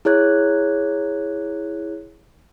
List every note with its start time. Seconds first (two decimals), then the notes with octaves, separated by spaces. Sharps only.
0.05 E4 G#4 C#5 F#6 G#6